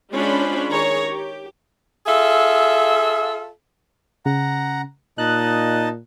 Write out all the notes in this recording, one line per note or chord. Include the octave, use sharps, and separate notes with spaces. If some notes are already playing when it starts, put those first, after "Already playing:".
G#3 C#4 D4 F4 C5 B5
D#3 G#4 C#5 A#5
G4
F4 G#4 A4 E5 F5
C#3 F#5 A#5
A#2 D#4 D#5 A5 F#6